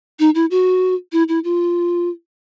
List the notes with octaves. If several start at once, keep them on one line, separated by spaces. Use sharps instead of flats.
D#4
E4
F#4
E4
E4
F4